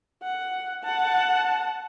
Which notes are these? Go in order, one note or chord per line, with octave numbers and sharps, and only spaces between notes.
F#5
F#5 A5